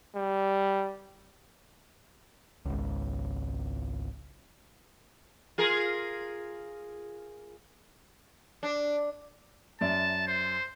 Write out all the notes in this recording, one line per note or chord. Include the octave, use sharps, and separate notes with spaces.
G3
G#1 C#2
F4 G#4 A#4
D4
F#2 D5 E5 A5
C5